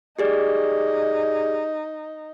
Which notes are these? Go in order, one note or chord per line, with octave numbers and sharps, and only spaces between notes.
D#4 G4 G#4 D5